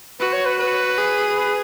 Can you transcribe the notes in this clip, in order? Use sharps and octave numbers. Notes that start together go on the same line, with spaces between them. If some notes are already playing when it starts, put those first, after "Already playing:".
F#4 B4
C#5
B4
B4
G#4
B4